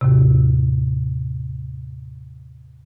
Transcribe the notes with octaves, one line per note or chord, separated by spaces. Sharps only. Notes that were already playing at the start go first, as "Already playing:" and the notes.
D#2 A2 C3